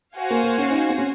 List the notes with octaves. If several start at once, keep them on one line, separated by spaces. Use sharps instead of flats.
F#4 C5 F5 G#5
A#3
A#3
C#4
D#4
C4
C#4